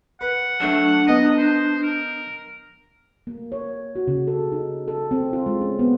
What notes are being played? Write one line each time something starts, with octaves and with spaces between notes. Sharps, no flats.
B4 F#5
F#3 A3 D4
B3 D#4 D#5
C5
A#4
A#3
C#5
F#4
C#3
A4
D#4
A4
C4
F4
G#3
C#4
B3